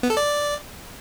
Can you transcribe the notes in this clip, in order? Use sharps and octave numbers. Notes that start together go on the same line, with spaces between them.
B3
A4
D5